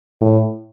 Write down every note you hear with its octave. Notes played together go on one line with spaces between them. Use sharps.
A2